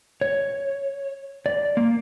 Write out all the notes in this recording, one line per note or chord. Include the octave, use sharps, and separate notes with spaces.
C#5
D5
A#3